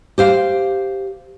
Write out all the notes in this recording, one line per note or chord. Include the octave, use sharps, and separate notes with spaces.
G4 C5 F5